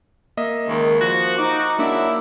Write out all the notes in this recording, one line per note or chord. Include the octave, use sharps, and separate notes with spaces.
A#3 D#5 E5
C#2 D#3
F3 F#4
D#4 D6
C#3 F#3 A#3 D4 E4 D6